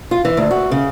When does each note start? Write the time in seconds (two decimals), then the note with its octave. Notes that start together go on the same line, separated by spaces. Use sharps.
0.11 F4
0.25 E3
0.37 D2
0.51 F#4
0.71 C#3